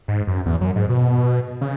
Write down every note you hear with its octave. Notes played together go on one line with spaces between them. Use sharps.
G#2
F#2
E2
F#2
G#2
B2
C#3